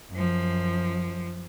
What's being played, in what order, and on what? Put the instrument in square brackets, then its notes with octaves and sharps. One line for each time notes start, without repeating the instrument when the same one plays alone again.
[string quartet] F#2 F3